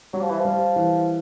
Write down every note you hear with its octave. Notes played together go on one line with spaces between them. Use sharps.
F#3 G3
F3
E3
F3
G3
E3